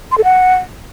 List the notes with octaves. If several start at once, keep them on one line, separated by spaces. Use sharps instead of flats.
C6
A4
F#5